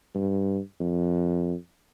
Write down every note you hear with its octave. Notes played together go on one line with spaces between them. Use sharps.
G2
F2